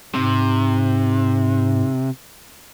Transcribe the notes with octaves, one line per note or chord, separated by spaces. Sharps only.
G#2 C3